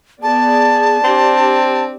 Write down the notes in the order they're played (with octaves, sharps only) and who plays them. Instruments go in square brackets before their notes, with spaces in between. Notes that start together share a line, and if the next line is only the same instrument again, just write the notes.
[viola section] B3 G#4 D5 [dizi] A5
[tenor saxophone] C4 [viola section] D4 G4